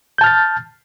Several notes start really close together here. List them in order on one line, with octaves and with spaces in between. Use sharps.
G6 A5 F6 A6